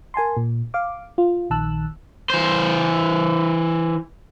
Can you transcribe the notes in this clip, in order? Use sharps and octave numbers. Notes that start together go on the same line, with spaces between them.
A#4 G#5 A5 C6
A#2
F5 D6
F4
A#1 D#3 A5 E6 F#6
E3 C5